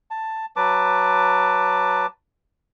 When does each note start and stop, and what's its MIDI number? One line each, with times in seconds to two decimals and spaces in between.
0.11 0.46 81
0.56 2.06 54
0.56 2.06 71
0.56 2.06 81
0.56 2.06 86